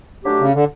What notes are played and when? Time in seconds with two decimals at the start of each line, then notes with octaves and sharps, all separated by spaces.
0.24 D3 F#3 A3 D4 G4
0.39 C#3
0.54 D3